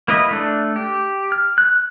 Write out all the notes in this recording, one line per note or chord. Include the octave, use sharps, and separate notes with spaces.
A#3 E4 B4 D#5
A3 D4
G4
F6
F#6